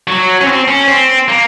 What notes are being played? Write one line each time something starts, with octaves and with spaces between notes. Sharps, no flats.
F#3
C#4
C4
C#4
C4
A#3